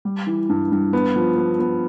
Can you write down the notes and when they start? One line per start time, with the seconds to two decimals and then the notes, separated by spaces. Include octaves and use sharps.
0.05 G3
0.27 E3
0.49 G2
0.72 G2
0.93 B3
1.16 F3
1.37 B3
1.59 B3